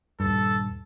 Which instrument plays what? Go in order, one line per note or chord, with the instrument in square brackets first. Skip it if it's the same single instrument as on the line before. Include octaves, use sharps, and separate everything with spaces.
[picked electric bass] D#1 G2 [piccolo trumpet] A4